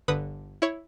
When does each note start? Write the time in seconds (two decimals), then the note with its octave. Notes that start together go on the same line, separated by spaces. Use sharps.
0.08 G1 D3 B4 D#6
0.62 E4 C#5